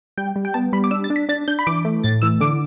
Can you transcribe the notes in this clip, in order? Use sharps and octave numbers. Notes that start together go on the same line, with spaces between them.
G3 G5
G3
G5
B3 A5
G3 B5
D6
D4 E6
A6
D4
B6
D4 A6
D4 G6
B5
E3 D6
A3
A2 A6
E3 E6
D3 D6